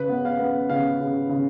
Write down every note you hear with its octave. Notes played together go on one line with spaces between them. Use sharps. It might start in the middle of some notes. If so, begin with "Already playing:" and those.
Already playing: C#3 B4
B3
F5
B3
C#3 F5
C#3
C#3